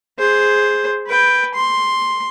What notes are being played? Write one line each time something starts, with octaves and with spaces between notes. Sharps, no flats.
G#4 C5
B4 G5
C6